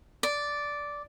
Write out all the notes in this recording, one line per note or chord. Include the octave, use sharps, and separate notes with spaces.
D5